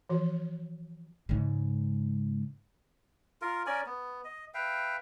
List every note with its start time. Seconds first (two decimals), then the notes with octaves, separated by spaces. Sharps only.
0.09 E3 F3 F#4
1.29 G#2 C#3
3.42 F4 A#4
3.66 C#4 A#4 D5 G#5
3.86 B3
4.25 D#5
4.54 B4 E5 F5 G5